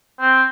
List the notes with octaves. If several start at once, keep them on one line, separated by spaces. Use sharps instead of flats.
C4